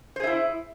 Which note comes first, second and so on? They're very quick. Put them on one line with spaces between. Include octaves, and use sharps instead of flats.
C5 G#4 E5 E4